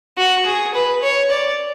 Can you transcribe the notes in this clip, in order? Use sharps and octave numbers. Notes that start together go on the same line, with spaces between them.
F#4
G#4
B4
C#5
D5